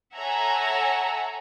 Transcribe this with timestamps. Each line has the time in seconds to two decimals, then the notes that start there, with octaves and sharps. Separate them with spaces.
0.14 A4 C#5 E5 F#5 G#5 A#5